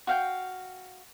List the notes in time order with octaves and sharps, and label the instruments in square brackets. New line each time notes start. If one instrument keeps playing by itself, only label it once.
[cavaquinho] F#4 F5 G5